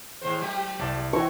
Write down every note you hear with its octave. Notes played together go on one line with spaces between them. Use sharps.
D#2 A2 C5
F#3 A3 G4
C2 D5 A5
E3 B3 C4 E4 C#6